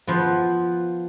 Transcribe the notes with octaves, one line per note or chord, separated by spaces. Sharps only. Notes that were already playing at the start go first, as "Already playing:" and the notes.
F3 B3